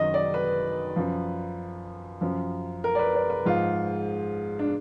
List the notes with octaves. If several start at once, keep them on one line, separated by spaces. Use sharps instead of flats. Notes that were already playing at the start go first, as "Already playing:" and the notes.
Already playing: F#2 D#3 F#3 D#5
D5
B4
F#2 F3
F#2 F3
A#4
D5
B4
D5
B4
G#2 F3 F4
D4